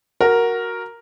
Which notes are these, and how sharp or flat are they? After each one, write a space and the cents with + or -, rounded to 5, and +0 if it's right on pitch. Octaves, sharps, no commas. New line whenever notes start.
F#4 +0 A#4 +0